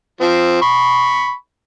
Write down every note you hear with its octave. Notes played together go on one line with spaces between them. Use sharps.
F3 C4
B5 C#6